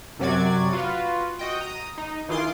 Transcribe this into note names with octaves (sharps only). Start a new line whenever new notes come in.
F#2 C3 F#3 F#4 D5 G#6
F4 F#4 B4
F#4 D#5 G5
A#5 D#6
D#4
D#3 E3 F4 G#4 C6 D6